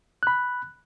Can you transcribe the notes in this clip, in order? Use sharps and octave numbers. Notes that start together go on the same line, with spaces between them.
B5 F#6